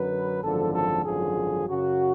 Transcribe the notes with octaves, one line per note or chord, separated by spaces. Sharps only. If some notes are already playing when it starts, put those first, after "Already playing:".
Already playing: F#2 D3 F#3 B4
G#1 F#2 D3 F3 A4
A4
G#1 F#2 D3 F3 G#4
F#2 C#3 F#3 F#4